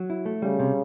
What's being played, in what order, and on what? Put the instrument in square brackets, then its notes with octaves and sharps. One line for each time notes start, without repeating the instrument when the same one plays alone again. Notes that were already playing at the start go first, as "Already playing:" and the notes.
Already playing: [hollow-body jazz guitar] F#3
E4
A3
[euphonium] C#3 [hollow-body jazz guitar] G3
[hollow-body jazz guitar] C3